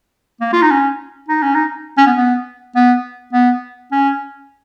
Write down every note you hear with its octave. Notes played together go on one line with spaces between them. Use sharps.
A#3
F4
D#4
C#4
D#4
C#4
D#4
C#4
B3
B3
B3
B3
C#4